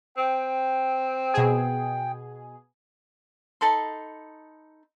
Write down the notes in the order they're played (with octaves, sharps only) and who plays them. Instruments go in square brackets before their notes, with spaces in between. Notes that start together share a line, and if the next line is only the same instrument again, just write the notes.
[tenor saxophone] C4 [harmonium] G5
[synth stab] B2 G#4
[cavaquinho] D#4 A4 B5 C6